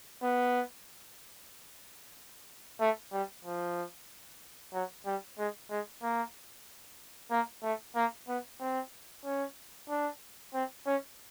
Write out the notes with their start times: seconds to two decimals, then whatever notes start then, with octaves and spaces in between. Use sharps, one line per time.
0.22 B3
2.80 A3
3.12 G3
3.45 F3
4.73 F#3
5.06 G3
5.38 G#3
5.70 G#3
6.03 A#3
7.31 A#3
7.63 A3
7.96 A#3
8.28 B3
8.61 C4
9.25 C#4
9.89 D4
10.54 C4
10.86 C#4